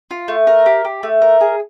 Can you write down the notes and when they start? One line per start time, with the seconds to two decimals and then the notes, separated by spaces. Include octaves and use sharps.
0.11 F4
0.28 A3
0.47 A#4
0.66 G4
0.85 G4
1.03 A3
1.22 A#4
1.41 G#4